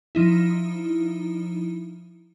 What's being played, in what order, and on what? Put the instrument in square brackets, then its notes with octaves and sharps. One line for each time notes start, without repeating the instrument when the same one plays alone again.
[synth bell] F3 D#4 E4